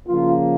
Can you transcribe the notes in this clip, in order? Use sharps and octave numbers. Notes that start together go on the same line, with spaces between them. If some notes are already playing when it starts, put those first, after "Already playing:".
C#3 F3 A#3 F4